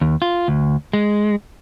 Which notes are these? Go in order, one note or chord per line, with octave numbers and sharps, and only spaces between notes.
D#2
F4
D2
G#3